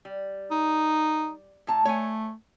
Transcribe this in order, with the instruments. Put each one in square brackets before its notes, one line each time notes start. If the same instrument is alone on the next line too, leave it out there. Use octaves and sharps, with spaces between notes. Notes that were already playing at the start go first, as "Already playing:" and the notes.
[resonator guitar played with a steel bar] G3
[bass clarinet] D#4
[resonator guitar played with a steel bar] A2 A5 A#5
[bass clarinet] A3 [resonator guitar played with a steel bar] C#5 G#5